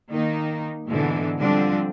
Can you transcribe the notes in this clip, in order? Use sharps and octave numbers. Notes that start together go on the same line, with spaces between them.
D#3 A#3 D#4
G#2 B2 D3 E3 G#3 D4
D3 F3 G3 C4 D4